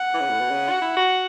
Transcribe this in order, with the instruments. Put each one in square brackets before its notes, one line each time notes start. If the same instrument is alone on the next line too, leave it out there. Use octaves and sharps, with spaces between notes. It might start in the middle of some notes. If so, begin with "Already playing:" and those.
Already playing: [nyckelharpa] F#5
[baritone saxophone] E3
C#3
A2
B2
C#3
F#4
E4
F#4